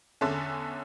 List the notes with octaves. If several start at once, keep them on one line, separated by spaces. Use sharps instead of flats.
E2 D3 A3 C#4 A5